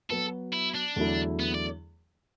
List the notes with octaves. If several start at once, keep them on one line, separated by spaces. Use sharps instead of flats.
F#3 B3 F#4 A4 B4
E4
D4
E2 D3 F#3 A3 E4
B3
D5